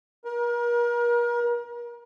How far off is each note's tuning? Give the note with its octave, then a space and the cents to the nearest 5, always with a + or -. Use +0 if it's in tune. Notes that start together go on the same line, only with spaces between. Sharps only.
A#4 +35